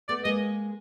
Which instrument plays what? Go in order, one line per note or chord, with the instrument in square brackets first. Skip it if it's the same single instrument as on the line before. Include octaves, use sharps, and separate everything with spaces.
[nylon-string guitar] A3 B3 [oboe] D5
[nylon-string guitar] G#3 A#3 [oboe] D#5